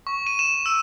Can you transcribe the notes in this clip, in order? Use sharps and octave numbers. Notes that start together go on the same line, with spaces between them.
C#6
D#7
E7
E6